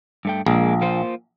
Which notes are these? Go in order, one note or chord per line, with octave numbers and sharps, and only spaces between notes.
G2 A3 G5
A#1 G#3 A#3
A#3 F4 C5